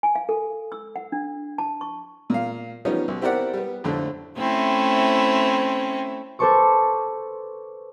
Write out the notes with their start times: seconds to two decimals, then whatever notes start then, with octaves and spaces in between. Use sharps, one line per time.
0.03 G#5
0.15 F5
0.29 A4
0.72 E6
0.96 F#5
1.12 D4
1.58 A5
1.81 C#6
2.30 A#2 F5
2.85 F3 G3 B3 C#4 D#4
3.08 B1
3.21 C4 E4 G4 A#4 D5 F#5
3.53 G3 B3
3.84 F2 A2 D3 A3 C4
4.37 A3 C4 C#4 E4
6.39 A4 B4 C5 A5 C#6 D6